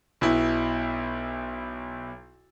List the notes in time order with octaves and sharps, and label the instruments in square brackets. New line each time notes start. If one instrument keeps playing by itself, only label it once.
[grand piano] B1 B2 E4